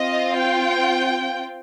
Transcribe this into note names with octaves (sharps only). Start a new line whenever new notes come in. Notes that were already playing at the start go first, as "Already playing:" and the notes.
Already playing: C4 F4 D#5
G5